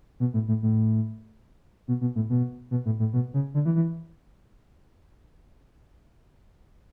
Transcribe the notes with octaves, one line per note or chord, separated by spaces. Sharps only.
B2
A2
A2
A2
B2
B2
A2
B2
B2
A2
A2
B2
C#3
D3
E3
E3